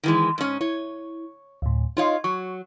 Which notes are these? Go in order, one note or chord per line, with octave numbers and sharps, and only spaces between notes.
D#3 E3 G#3
G#2 C#4
E4 C#5
D2 A2
D#4 F4 C#5 D#5 F5
F#3 C#6